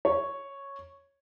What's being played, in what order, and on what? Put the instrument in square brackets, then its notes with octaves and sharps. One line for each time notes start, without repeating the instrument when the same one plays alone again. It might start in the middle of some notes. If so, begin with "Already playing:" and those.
[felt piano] C#5